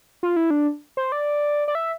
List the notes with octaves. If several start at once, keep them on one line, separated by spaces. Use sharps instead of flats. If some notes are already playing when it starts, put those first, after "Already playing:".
F4
E4
D4
C5
D5
D5
E5